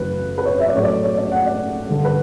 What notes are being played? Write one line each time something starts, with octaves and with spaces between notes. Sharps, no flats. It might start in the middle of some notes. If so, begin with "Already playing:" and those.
Already playing: F#2 C#3 E3 A3 B4
B4
C#5
E5
D5
A2 F#3 A3 C#5
D5
C#5
D5
F#5
D5
G2 D3 G3
B4